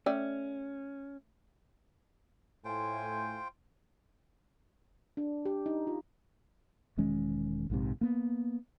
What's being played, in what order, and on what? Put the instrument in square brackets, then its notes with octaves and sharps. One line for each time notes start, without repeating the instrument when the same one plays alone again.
[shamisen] A3 D5 G5 [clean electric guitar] C#4
[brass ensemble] A2 A3 G#5 [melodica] F4 C5 G5
[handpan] D4
G4
D#4
F4
[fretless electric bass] E1 D#3 G#3 C#4
A#1 G#2 C3
A#3 B3